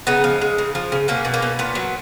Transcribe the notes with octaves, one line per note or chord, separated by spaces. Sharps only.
C#3 B3 D#4
F3
G#3
C#3
F3
C#3
B2 A#3 C#4
B2
A#3 C#4
B2
A#2 B3
F#3